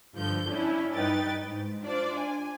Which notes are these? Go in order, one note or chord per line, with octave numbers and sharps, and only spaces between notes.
G2 D3 F3 G6
C#4 D4 E4
G2 D#4 B4 G5 A6
G#2
D4 F4 C5 D5
G#5